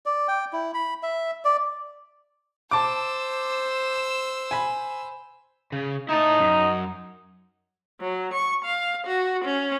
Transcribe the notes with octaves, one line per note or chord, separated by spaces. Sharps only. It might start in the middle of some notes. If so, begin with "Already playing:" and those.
D5
G5
E4
B5
E5
D5
C5 A5 D6 E6
G#5 B5
C#3
D#4 E4 A5
F#2
F#3
C#6
F5
F#4
C#4